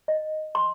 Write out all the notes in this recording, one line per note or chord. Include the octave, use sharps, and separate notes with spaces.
D#5
C6